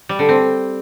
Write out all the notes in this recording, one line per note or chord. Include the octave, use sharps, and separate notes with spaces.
G3
D3
C4